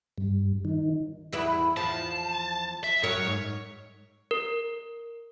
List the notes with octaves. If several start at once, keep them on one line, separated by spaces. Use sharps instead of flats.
G2
D#3
E2 E4 B4
E2 F3 A5
E5
F#2 F#3 A#4 C#5
G#2
A#4